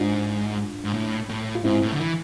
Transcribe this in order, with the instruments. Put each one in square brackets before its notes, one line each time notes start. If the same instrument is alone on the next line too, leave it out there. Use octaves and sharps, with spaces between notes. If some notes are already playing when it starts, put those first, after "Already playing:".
Already playing: [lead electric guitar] G#2 [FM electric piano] D4 F4
[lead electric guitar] G#2
A2
A2
[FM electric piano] F4
[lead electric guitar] G#2 [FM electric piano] C4 E4
[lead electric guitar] A2
D3
E3